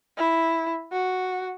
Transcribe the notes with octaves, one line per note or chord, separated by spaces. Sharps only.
E4
F#4